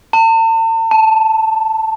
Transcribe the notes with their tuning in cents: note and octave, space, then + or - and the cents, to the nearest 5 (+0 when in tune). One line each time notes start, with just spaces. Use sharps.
A5 +45
A5 +0